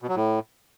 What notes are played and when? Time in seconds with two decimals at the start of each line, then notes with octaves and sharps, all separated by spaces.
0.02 B2
0.09 F#3
0.16 A2